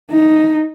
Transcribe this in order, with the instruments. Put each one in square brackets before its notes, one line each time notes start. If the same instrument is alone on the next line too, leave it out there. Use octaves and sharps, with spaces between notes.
[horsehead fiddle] D#4